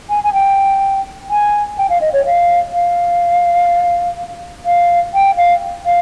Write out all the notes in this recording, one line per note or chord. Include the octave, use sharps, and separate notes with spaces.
G#5
G#5
G5
G#5
G5
F5
D#5
C#5
F5
F5
F5
G5
F5
F5